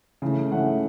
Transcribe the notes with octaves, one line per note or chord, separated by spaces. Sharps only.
C#3 E3 A3
C#3 E3 A3 F#5